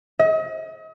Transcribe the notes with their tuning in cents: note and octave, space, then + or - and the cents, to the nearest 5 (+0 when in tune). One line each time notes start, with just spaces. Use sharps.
D#5 +40